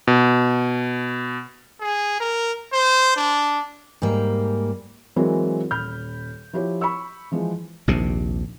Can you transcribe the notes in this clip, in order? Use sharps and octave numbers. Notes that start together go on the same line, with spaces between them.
B2
G#4
A#4
C5
D4
G#2 G3 A#3
E3 F#3 G#3 C4 A#4
D#1 B5 F6 G6
F3 E4 G4 C#5
B5 C#6 E6
E3 F3 G#3
A#1 D#2 C3